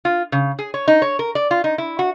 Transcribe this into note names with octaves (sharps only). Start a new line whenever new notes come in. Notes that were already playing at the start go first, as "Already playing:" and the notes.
F4
C#3
G#4
C#5
D#4
C#5
A#4
D5
F4
D#4
E4
F#4